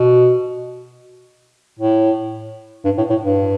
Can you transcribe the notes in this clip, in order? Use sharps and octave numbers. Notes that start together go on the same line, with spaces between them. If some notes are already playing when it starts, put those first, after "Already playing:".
Already playing: B2
A2
G2
A2
A2
G2